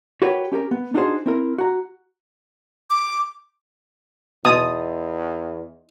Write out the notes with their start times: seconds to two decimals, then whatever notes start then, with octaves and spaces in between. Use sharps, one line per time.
0.22 F#4 G4 A#4 B4 C#5 F#5
0.52 C#4 G4 A4 A#4
0.71 B3
0.94 D4 D#4 F4 F#4 G#4 C5
1.26 C4 E4 A#4
1.58 F#4 A#5
2.90 D6
4.45 E2 B2 D#4 D#5 C6 D#6